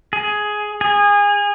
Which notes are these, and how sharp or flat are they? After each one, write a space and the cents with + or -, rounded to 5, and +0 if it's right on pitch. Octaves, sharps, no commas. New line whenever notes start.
G#4 +10
G#4 -25